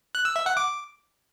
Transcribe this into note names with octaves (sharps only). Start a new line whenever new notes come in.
F#6
E6
E5
F#5
D6